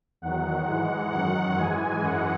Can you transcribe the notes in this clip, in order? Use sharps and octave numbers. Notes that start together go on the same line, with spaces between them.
E2 D#3 F#3 F#5
G#2 E3 G#3
F#2 D#3 F#3 F#5
G#2 E3 G#3 G#5
F#2 E3 G#3 F#5